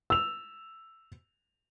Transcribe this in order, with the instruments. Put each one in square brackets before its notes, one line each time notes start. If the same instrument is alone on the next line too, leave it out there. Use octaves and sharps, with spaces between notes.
[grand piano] E6 F7